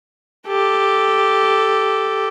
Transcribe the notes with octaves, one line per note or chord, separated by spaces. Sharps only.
G4 A4